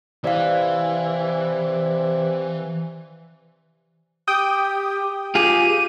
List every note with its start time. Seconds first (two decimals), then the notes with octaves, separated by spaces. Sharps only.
0.24 C3 E3 D5 F5
4.28 G4 G5 D#6
5.35 F4 G4 G#4 D#7